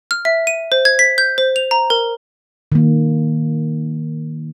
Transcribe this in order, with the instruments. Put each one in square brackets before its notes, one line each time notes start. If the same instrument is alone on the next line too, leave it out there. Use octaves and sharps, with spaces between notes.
[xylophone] F6
E5
D#7
C5
G#6
B6
G6
C5
F7
A#5
A#4
[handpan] D#3 A#3